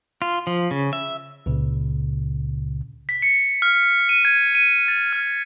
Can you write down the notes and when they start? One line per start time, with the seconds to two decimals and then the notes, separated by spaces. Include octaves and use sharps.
0.22 F4
0.47 F3
0.71 C#3
0.93 E5
1.46 C#2 A#2 C#3
3.09 B6
3.22 C#7
3.62 F6
4.09 D#7
4.25 G#6
4.55 D#7
4.88 A6
5.13 F6